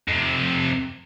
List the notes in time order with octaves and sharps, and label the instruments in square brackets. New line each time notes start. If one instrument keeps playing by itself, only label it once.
[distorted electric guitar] F2 C3